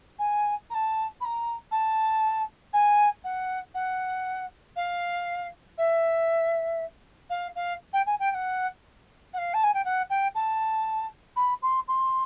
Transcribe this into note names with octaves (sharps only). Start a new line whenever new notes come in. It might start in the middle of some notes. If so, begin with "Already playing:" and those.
G#5
A#5
A5
B5
A#5
A5
G#5
F#5
F#5
F5
E5
F5
F5
G5
G#5
G5
G5
F#5
F#5
F5
A5
G#5
G5
F#5
G5
A5
B5
C6
C6